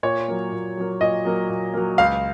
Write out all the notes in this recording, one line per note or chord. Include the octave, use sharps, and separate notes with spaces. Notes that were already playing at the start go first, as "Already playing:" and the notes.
A#2 C#5
F#3 A#3
A#2
F#3 A#3
A#2 D#5
F#3 A#3
A#2
F#3 A#3
C#2 F5